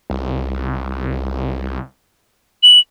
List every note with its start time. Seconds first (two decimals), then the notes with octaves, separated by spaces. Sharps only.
0.10 C2
2.63 F#7